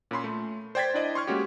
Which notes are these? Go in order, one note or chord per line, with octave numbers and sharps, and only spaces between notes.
A#2 C#4 B5 C6
A3
C5 D5 G5 G#6 A6 B6
D4 E4 D5 D#5
C6 C#6 F6 G#6
G#3 A#3 C#4 F#4 G4